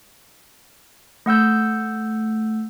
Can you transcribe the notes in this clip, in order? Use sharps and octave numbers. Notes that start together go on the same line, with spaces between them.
A3 F#5 E6 G6